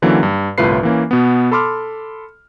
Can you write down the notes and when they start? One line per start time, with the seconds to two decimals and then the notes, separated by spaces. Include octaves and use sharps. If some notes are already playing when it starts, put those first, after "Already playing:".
0.02 D3 E3 F#3 A#3 C#4
0.23 G2
0.58 G1 C2 A2 F4 B4 C7
0.83 E3 A#3 C#4
1.11 B2 B3
1.52 A4 B5 C6 D6 F6